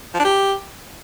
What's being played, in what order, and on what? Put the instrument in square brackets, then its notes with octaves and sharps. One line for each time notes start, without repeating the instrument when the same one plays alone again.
[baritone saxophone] F3
D4
G4